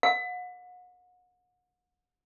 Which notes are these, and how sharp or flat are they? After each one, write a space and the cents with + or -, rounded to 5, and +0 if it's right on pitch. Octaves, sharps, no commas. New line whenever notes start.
F#5 -35